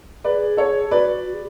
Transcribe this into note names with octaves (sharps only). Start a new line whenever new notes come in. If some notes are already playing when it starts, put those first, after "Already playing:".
G#4 B4 D5
A4 C#5
F#4 B4 D5
F#4
G#4